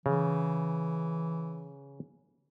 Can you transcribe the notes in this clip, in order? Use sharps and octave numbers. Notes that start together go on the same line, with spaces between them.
C#3 E3